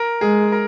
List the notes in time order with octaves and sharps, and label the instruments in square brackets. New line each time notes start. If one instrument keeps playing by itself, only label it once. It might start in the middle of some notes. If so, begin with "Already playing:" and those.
Already playing: [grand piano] A#4
[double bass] G#3 [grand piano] G#4
[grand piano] A#4